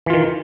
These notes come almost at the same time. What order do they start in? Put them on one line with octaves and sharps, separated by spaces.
E3 F4 D#3